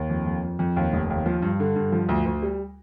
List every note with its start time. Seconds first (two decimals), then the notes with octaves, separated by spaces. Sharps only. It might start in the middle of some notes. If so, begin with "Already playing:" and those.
Already playing: D#2
0.10 F2
0.27 F2
0.44 F2
0.59 F2
0.76 D#2
0.93 F1
1.10 D#2
1.26 F3
1.42 G2
1.60 D3
1.76 G2
1.92 F3
2.09 D2
2.25 D2
2.42 G3